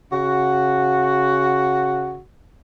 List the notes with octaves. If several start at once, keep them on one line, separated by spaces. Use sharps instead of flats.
C#3 F#4